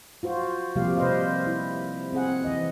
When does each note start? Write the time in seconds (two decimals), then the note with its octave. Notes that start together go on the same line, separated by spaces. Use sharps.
0.23 F4 F#4 C5
0.76 C3 F3 G3 A#3 G4 F5
0.97 C3 B4 C5 D5 D#5 F5
1.46 E4
2.13 C4 G#4 F#5
2.44 E3 D#5